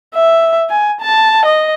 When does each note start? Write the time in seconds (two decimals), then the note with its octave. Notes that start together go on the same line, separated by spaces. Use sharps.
0.15 E5
0.70 G#5
1.01 A5
1.45 D#5